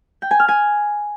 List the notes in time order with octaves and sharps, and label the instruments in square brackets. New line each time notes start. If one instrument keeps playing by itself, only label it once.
[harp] G5
G#5
F6
G#5